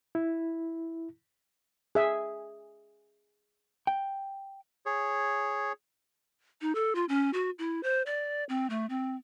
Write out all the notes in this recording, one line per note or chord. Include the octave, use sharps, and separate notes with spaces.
E4
G#4 E5 G#5
G5
G#4 C#5
D#4
A4
F4
C#4
F#4
E4
C5
D5
C4
A3
C4